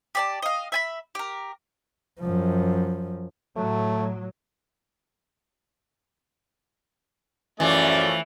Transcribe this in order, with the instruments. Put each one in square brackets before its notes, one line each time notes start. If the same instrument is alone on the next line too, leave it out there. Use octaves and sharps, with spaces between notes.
[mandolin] G4 D5 A5
D#5 F5
E5 G#5 B5
G4 A#4
[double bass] F#2 F3
[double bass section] A2 F#3 [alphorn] A3
[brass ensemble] F#2 D5 [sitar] E3 [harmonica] F3 A3 C#4